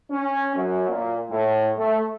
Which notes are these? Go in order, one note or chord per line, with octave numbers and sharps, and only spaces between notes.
C#4
F#2
A#2
A2
A3